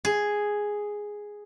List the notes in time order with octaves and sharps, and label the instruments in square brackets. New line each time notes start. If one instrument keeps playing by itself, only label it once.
[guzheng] G#4